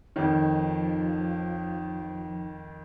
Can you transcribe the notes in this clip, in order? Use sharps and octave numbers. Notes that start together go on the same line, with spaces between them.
F2 D#3 F3 D#4 C#5